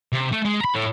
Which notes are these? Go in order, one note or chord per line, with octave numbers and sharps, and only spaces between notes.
C3
A3
G#3
A#5 B5
A2